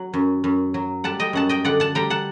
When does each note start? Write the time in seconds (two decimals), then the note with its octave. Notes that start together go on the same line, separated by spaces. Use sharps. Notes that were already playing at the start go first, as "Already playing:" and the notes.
Already playing: F#3 F#5
0.14 F#2
0.44 F#2
0.74 F#3
1.04 G3 F#5 A5
1.20 D#5 G5
1.33 F#2 F#5 A5
1.49 D#5 G5
1.65 D3 D5 F#5
1.80 F#5 A5
1.95 G3 G5 A#5
2.10 F#5 A5